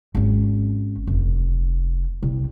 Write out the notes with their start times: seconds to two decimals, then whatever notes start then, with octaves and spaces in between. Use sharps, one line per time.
0.15 G#1 C#4
1.07 F1
2.23 C2